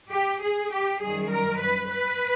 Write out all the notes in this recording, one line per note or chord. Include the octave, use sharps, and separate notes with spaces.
G4
G#4
G4
F#2 D#3 G3 G#4
A#4
B4
B4